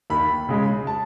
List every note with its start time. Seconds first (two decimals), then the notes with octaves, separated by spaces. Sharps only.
0.10 D#2 B5
0.49 C#3 G#3
0.87 A5